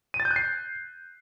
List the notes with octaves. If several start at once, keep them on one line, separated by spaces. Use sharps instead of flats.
D#7
A6
G6
F#6
C7